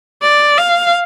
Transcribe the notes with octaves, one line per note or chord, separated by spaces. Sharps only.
D5
F5